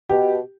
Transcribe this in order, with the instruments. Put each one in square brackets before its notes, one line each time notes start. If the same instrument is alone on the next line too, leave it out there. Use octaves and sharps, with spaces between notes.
[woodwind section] B2 [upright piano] G4